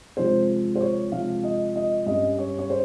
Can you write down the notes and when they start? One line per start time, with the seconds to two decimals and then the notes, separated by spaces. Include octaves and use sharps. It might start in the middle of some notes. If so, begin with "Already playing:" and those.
0.17 C3 F3 G#3 C5
0.76 C5
0.80 C#5
1.12 C3 F3 G#3 F5
1.43 D#5
1.76 D#5
2.06 G2 G3 C#4 D#5
2.38 C#5
2.59 C#5
2.70 C5